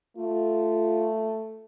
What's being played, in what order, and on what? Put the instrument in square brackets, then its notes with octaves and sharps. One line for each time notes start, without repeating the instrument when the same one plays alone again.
[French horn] A3 [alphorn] F4